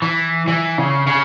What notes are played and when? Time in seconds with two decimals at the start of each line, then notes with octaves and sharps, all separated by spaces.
0.02 E3
0.48 E3
0.78 C#3
1.07 C#3